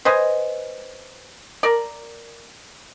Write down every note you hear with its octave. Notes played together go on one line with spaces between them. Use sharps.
B4 C5 D#5 G#5
A#4 D5